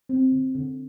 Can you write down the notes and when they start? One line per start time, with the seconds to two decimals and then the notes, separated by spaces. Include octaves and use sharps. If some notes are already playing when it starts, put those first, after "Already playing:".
0.09 C4
0.32 D3
0.55 D3